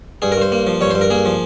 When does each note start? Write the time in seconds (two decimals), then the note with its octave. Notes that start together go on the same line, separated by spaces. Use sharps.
0.22 G2 G#4
0.32 A#4
0.37 G2 C5
0.52 A#3
0.67 F3
0.81 G2 C#5
0.91 C5
0.95 G2
1.01 A#4
1.10 A#3 G#4
1.26 F3